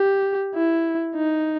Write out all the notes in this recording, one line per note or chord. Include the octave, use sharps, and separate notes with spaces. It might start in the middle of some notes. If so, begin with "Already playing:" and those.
Already playing: G4
E4
D#4